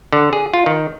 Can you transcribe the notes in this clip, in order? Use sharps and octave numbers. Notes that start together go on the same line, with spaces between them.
D3
G#4
F4
D#3